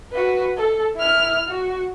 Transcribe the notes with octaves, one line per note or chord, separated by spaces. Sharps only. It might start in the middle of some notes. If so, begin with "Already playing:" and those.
F#4 B4
A4
E4 F6
F#4